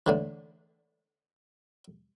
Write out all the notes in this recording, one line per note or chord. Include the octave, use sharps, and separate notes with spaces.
A2 D3 E3